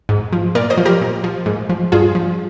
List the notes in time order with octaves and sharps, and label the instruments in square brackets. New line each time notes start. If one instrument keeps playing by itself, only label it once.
[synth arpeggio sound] G#2
F3
A#2 A#4 D5
C5 D#5
F3
G4 A#4
A#2
F3
G#2
F3
G2 F4 G#4
F3